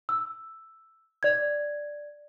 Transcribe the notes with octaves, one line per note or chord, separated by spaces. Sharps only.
E6
D5 G#6